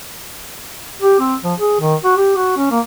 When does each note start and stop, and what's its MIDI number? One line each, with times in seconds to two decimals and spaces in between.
1.02 1.17 67
1.20 1.34 60
1.44 1.54 53
1.59 1.79 68
1.80 1.95 51
2.04 2.12 66
2.17 2.33 67
2.36 2.56 66
2.56 2.70 61
2.71 2.79 58